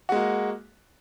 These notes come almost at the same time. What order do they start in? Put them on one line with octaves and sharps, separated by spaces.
F#4 G#3 A#3